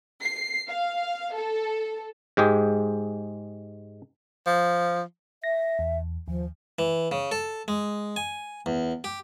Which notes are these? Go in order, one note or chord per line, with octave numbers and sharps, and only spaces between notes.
C7
F5
A4
G#2 G#3 G4 G#4
F3
E5 A#6
E2
D#2 F3
E3
C#3
A4
G#3
G#5
E2
G4